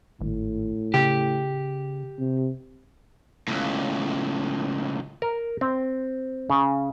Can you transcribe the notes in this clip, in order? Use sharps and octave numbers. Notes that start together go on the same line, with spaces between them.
G#1 A2
C#3 G4
C3
C#2 A2
A#4
C4
C#3